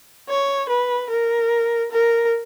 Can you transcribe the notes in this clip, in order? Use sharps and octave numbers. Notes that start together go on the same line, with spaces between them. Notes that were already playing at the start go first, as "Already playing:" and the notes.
C#5
B4
A#4
A#4